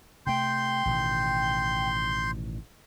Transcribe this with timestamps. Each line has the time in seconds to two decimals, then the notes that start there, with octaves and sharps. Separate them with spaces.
0.27 C3 A3 G5 C6 G6
0.85 A1 B2 D#3